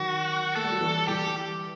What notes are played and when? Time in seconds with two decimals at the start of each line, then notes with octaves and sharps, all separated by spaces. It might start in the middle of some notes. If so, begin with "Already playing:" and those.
Already playing: D#3 F#3 F#4
0.55 A3 A4
0.64 G3
0.72 F#3
0.80 E3 G3
1.08 E3 G3 G4